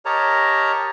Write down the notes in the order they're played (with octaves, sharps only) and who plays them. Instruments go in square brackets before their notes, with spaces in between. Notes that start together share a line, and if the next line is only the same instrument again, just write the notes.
[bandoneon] G4 A#4 C#5 D#5 A5 A#5